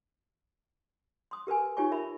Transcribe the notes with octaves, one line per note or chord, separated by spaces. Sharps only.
C6 D#6
G4 A#4 B4 G#5
D#4 F4 G4 C#5 G#5 C#6
A#4 E5 B5